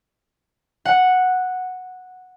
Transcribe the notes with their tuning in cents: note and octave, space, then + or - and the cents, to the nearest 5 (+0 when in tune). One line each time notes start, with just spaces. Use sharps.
F#5 -5